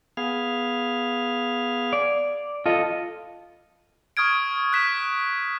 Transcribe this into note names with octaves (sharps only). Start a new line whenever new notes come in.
B3 G#4 F5
D5
F4 A4 D#5
C#6 D#6 F6 G#6 D7
F#6 B6 E7